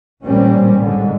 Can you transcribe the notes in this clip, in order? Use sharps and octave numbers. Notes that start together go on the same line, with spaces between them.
A1 A#2 G3 C4 C#4
G#2 D3